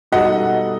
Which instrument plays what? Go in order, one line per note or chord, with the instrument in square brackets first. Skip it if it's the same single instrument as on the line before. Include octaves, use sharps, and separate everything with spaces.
[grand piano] B2 G3 D#4 A4 [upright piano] D#5 F#5